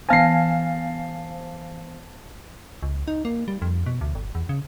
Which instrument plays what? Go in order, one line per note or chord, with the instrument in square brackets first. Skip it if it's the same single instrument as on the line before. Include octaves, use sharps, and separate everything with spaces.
[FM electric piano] E3 B3 C5 [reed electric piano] F5 G#5 [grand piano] A5 A#6 C7
[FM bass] C#2
D#4
A#3
G3
F2
B2
D2
G1
E2
C#3